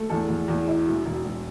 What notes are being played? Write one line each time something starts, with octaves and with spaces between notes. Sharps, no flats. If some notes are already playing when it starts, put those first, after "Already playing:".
Already playing: A3
E2 A4
E2
E2
E4
E1
E1
E1